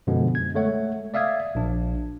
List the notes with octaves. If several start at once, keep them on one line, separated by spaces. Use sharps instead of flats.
F#2 B2 D3 F3 G#3 B3
G#6
G#3 A3 C#5 F#5
D5 E5 F5 D#6 G#6
A#1 D4